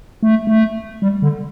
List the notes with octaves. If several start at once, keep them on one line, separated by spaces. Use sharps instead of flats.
A3
A3
G3
D3